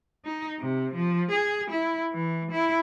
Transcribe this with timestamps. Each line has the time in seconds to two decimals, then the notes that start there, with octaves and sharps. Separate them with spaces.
0.25 D#4
0.60 C3
0.94 F3
1.31 G#4
1.71 E4
2.12 E3
2.51 E4